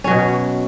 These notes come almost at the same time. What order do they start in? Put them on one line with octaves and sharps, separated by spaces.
C#4 F#3 B2